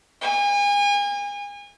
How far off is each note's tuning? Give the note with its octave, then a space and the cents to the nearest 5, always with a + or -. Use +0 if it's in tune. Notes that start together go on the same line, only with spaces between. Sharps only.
G#5 -35